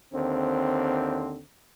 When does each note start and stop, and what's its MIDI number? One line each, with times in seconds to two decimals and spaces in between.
0.13 1.41 39
0.13 1.41 50
0.13 1.41 60